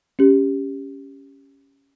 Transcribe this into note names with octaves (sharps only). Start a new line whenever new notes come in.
C#4 G4